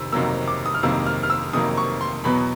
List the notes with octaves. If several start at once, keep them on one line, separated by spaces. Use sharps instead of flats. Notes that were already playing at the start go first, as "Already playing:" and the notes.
Already playing: F2 C3 D#3 E6
F2 C3 D#3 F#3 A#3 E6
D6
D#6
F6
F2 C3 D#3 F#3 A#3 E6
F6
F6
E6
F2 C3 D#3 F#3 A#3 D#6
C#6
C6
E2 B2 F#3 B3 B5